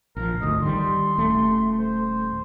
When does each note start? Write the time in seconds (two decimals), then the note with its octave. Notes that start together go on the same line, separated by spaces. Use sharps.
0.16 A#1 F3 A#4
0.42 G#1 D2 D#5
0.62 D#3 G3 C6
1.18 D#1 A3
1.79 C5